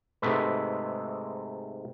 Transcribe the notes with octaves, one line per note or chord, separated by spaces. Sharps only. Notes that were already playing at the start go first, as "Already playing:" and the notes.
G#2 C3 G#3 A3 B4